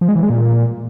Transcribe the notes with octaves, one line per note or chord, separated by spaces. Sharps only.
F3
G#3
E3
G#3
A#2